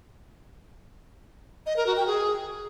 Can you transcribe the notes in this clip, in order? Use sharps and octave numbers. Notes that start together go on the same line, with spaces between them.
D#5
A#4
F#4
G5
G#4